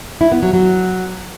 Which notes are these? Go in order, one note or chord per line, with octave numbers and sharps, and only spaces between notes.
E4
B3
F#3
F#3